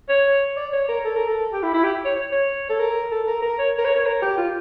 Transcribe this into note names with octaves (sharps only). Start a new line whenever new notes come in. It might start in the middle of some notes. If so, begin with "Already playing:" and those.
C#5
D5
C#5
A#4
A4
A#4
A4
G4
E4
E4
G4
C#5
C#5
C#5
A4
A#4
A4
A#4
A#4
C#5
A#4
C#5
C#5
A#4
G4
F4